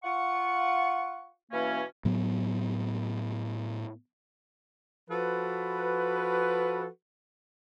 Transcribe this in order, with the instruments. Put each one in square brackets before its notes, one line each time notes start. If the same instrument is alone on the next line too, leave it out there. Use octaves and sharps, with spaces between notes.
[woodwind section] F4 F#5 C#6
B2 E3 A#3 C#4
[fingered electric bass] A2 F#3 B3
[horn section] F3 F#4 A4 B4